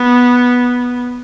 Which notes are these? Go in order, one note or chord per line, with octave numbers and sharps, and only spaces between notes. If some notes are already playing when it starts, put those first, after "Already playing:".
Already playing: B3